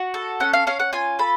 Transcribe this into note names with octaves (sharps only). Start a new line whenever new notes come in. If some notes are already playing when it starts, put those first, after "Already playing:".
Already playing: F#4
A4
C#4 F#5
F5
C#4 F5
F#5
F4 G#5
A4 B5